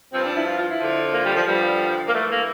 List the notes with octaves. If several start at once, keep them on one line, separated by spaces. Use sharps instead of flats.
G2 F3 C4
D4
E4
F4
F4
E4
F2 D3 F3
A#3
G3
F3
G2 D3 F3 G3
A#3
G2 E3 A3
A#3